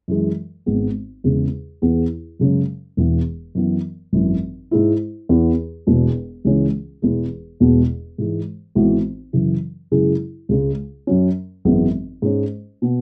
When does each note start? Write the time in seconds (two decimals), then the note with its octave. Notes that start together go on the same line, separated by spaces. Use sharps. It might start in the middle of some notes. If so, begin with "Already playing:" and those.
0.08 F#2 E3 G#3
0.66 G#1 G#2 G#3 B3
1.24 E2 C#3 G#3
1.82 E2 E3 B3 E4 G#4
2.39 F#2 C#3 G#3 C#4
2.97 E1 E2 E3 B3
3.55 F#2 E3 B3
4.13 G#1 F#2 E3
4.71 G#2 G#3 E4
5.29 E2 E3 B3
5.87 E1 E2 B2
6.45 C#2 C#3 E3 G#3 C#4
7.02 E1 E2 E3 G#3
7.60 E1 E2 B2 G#3 B3
8.18 G#2 E3 G#3
8.75 G#1 G#2 E3 B3 F#4
9.33 F#2 C#3 E3
9.91 F#2 C#3 G#3 E4 G#4
10.49 C#2 C#3 G#3
11.07 F#2 F#3 C#4
11.65 G#1 F#2 E3 G#3 B3
12.22 G#2 G#3 C#4
12.82 B2 B3